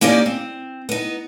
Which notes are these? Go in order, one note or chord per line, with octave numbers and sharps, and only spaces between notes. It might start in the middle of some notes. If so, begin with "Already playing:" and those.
A#3 C#4 D#4 G4 D5
C4
B3 D#4